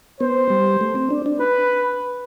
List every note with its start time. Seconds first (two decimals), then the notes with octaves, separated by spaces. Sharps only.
0.20 B3 C5
0.50 G3
0.81 A3
0.95 C4
1.11 D4
1.26 D4
1.40 B4